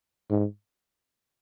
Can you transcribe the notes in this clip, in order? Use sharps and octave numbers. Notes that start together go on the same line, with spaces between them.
G#2